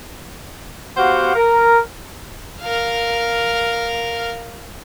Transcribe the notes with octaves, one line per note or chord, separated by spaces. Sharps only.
B3 F#4 G4 C5 F5 F#5
A#4
A#4 F5